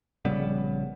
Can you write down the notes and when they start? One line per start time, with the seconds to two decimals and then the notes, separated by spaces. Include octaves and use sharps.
0.25 A#1 C#3 G3 B3